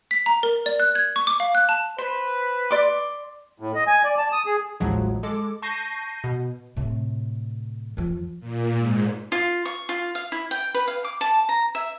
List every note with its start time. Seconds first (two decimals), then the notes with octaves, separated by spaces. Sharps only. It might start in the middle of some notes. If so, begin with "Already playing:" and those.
0.11 B6
0.26 A#5
0.43 A#4
0.66 D5
0.80 F#6
0.95 G#6
1.16 C#6
1.27 D6
1.40 F5
1.55 F#6
1.69 A5
1.98 B4 C5
2.71 D5 C6 D6
3.60 A2
3.75 D#5
3.87 G#5
4.04 D5
4.18 A5
4.32 D#6
4.46 G#4
4.80 A1 D#2 A2 F3 F#3 G#3
5.23 G#3 A4 D6
5.62 A5 C#6 G6 A#6 C7 D#7
6.24 B2
6.77 A2 C3
7.97 F2 F3
8.40 A#2
8.76 G#2
9.32 F4
9.65 C#6
9.89 F4
10.15 F5
10.32 E4
10.51 G5
10.74 B4
10.88 F5
11.04 D6
11.21 A5
11.49 A#5
11.75 E5